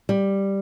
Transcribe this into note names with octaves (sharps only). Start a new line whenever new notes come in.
G3